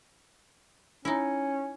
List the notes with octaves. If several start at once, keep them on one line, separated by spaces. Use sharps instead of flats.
C#4 D#4 E4